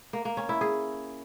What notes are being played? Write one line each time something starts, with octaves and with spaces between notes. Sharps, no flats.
A#3
A#3
C#4
E4
G#4